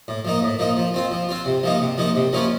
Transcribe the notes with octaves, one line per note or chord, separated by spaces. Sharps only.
A2
F3 A#3 D#4
A2
F3 A#3 D#4
F3
C4 F4
F3
C4 F4
C3
F3 A#3 D#4
C3
F3 A#3 D#4
C3
F3 A#3 C#4 F4